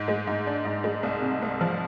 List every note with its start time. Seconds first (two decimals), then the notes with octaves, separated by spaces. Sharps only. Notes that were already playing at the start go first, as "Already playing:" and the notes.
Already playing: G#2
0.08 G#3
0.27 G#2
0.47 D4
0.65 G#2
0.84 G#3
1.03 C2
1.22 C3
1.42 C2
1.61 F3